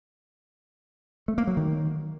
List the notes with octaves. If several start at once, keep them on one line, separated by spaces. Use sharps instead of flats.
A3
A#3
F#3
D#3